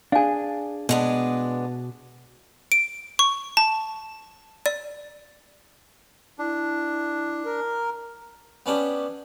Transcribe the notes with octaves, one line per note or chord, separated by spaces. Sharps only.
D4 G#4 F5 G#5
B2 G#3 B3 D4
D7
C#6
A5
D5
D4 E4
A#4
B3 C#4 D4 G4